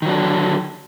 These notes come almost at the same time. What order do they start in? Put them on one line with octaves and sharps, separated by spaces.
D#3 F#3 D4 D3